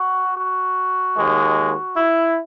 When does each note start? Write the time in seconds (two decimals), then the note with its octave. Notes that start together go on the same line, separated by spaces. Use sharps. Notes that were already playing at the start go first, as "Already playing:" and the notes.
Already playing: F#4
0.35 F#4
1.16 D#2 D#3 G#3
1.97 E4